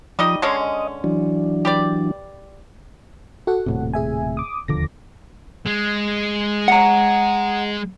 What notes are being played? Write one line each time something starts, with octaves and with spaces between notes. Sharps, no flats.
F3 G3 D#4 D#5 D#6
D3 G#3 C#4 G#5 C6
D#5
E3 F#3 D4
G4 B4 D5
F#4 A4 F#5
D#1 A2 C3
G#4 E5 G#5
D6 D#6
E1 D#2 D3 F3 D6 A#6
G#3
F#5 A#5